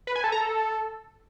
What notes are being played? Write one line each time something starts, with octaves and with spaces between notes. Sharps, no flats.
B4
G#5
A4
A#5
A4